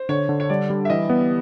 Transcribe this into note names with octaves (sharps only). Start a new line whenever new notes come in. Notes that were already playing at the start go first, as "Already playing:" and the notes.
Already playing: C5
D3 C#5
D3
C#5
G3 D5
G3
E5
E3 D#5
B3